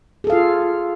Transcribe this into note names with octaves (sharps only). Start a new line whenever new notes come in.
F4 G#4 A4 F5